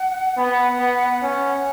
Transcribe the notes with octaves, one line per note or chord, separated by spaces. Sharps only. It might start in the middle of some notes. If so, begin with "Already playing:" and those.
Already playing: F#5
B3 F#5 G#5
B3
C#4 F#5